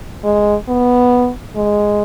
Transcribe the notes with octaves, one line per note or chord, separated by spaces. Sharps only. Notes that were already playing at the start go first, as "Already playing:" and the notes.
G#3
B3
G#3